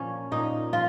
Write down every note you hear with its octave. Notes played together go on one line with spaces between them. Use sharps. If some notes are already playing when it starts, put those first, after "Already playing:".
Already playing: A#2 F3 C#4
A#2 D#4
F3 F4